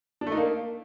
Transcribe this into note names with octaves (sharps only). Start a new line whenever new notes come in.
D4
A3
D#4
A#3